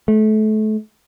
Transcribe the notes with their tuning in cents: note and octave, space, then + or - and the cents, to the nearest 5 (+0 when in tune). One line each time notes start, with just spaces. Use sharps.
A3 -30